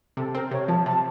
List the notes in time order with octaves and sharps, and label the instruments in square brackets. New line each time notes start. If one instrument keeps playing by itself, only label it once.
[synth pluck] C3 [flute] A4
[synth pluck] C4 [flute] A#4
[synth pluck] C3 [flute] C#5
[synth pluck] F3 [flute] A5
[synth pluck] C3 [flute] A5